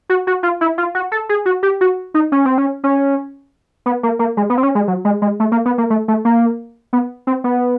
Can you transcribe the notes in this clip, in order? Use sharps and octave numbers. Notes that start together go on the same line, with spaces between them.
F#4
F#4
F4
E4
F4
F#4
A4
G#4
F#4
G4
F#4
D#4
C#4
C4
C#4
C#4
B3
A#3
A#3
G#3
B3
C4
C#4
G#3
F#3
G#3
G#3
A3
A#3
B3
A#3
A3
A3
A#3
B3
C4
B3